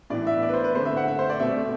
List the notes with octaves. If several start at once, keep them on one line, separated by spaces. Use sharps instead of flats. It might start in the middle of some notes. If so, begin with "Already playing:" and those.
A2 E3 B3 D5
E5
D5
B4
C5
B4
D3 A3 C4 C5
E5
F#5
E5
C5
D5
B2 A3 C4 E5